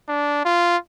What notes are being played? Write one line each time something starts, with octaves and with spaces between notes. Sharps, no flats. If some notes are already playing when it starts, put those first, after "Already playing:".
D4
F4